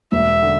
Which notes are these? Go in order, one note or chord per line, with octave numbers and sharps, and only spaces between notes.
E1 E5
D3